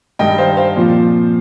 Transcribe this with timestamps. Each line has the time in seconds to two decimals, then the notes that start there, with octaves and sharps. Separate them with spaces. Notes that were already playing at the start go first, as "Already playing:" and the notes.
0.19 G2 D#3 G3 D#5 G5
0.38 C5 F5
0.57 C5 F5
0.76 A#2 F3 C4